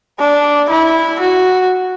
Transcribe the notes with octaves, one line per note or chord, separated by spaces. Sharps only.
D4
E4
F#4